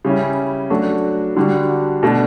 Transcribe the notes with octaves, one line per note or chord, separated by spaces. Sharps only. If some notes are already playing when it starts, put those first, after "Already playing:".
C#3 G3 C#4 E4
F#3 A3 D4 F#4
D3 G3 D4 F#4
B2 A3 D4